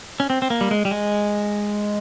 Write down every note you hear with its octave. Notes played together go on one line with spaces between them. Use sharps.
C#4
C4
C4
A#3
G3
G#3
G3
G#3